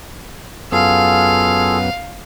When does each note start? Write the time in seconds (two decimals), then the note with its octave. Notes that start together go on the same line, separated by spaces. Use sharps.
0.72 F#2 B3 F4 G#4 A4 F5